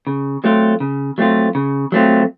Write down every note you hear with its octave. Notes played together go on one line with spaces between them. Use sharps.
C#3
F#3 A3 C4 F4
C#3
F#3 A3 C4 F4
C#3
F#3 A3 C4 F4